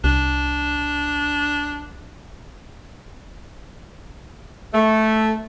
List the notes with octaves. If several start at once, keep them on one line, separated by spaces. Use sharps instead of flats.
C2 D4
A3